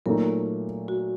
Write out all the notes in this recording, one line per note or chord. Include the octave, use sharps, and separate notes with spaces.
A#2 F#3 A3 D#4 A#4
F#4